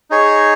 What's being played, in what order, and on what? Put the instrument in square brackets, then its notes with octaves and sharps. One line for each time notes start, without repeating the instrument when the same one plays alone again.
[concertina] D#4 G#4 C#5